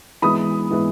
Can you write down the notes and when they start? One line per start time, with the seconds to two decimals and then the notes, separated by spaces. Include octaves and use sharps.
0.22 E3 G#3 B3 B5 D#6
0.71 E3 G#3 B3